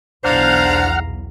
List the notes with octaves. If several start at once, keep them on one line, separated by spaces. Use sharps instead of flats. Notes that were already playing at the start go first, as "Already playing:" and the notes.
B1 E2 D4 C5 F5 F#5 A#5 F6